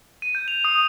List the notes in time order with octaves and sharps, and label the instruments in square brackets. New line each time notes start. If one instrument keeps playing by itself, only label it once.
[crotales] D#7
G6
F7
D#6